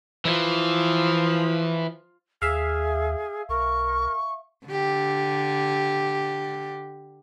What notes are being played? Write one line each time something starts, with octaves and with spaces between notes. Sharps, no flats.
E3 F3
D#2 G#4 E5 F5
B1 A#4 C#6
D3 G4